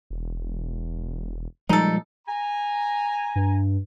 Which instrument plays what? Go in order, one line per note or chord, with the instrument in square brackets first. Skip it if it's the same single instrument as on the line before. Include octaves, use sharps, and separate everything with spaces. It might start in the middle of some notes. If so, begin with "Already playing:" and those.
[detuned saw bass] E1
[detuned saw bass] A#2 [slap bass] F3 G3 G#3 [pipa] D#4 A4
[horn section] G#5 A#5
[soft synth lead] G2